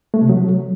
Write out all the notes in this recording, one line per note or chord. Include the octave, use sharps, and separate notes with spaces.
A3
C3
F#3